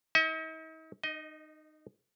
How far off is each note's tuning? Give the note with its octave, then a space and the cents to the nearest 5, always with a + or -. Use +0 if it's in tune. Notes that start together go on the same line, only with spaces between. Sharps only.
D#4 +45 D#5 +45
D#4 -20 D#5 +15